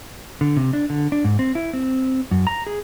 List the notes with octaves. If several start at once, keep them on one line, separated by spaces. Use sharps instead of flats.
D3
C3
D4
D3
D4
G#2
C4
E4
C4
F#2
A#5
G#4